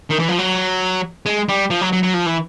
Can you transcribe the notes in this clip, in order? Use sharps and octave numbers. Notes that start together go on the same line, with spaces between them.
D#3
E3
F3
F#3
G#3
G3
F3
F#3
F#3
F#3
F3
E3